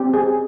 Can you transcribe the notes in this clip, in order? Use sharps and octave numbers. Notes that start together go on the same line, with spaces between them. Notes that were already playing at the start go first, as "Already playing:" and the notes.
Already playing: C4 G4
G#4